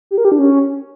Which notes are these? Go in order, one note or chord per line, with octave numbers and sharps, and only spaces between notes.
G4
A#4
G4
D4
C#4